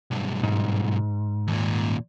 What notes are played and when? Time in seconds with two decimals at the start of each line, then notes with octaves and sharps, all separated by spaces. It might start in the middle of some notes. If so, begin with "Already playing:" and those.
0.11 B1 G2
0.43 G#2
1.47 D#2 A#2